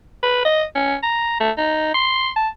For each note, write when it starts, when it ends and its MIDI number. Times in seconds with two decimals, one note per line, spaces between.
0.23 0.44 71
0.45 0.64 75
0.75 0.95 61
1.03 1.36 82
1.40 1.51 57
1.58 1.93 63
1.95 2.30 84
2.36 2.49 81